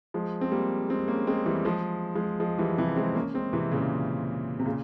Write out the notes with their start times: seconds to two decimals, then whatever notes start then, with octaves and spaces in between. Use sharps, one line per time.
0.14 F3 G#3
0.41 C4
0.52 G3 A#3
0.89 G#3 C4
1.08 A#3 C#4
1.27 G#3 C4
1.46 E3 G3
1.65 F3 G#3
2.15 F3 G#3
2.40 F3 G#3
2.58 E3 G3
2.78 C3 E3
2.96 G#3 C4
3.15 A#3 C#4
3.34 G#3 C4
3.53 C3 E3
3.72 A#2 C#3
4.59 C3
4.65 A#2 C#3